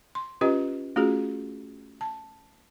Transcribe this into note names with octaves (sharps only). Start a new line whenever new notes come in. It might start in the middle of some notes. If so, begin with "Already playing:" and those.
C6
C#4 F4 G4 B4 D#5
A3 C#4 F4 F#4 G#4
A5